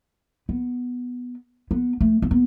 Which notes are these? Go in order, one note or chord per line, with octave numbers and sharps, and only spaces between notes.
B3
B3
A3
C4
B3